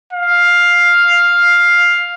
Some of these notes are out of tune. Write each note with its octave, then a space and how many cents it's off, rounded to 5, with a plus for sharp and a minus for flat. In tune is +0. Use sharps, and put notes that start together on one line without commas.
F5 +5